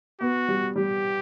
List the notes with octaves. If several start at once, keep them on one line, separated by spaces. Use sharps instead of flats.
B3 F#4
G3
G3 G4